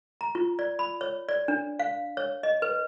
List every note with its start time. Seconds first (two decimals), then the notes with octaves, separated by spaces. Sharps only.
0.21 A#5
0.35 F4
0.59 D5
0.79 B5
1.01 C#5
1.29 D5
1.48 D4
1.80 F5
2.17 C#5
2.43 D#5
2.62 B4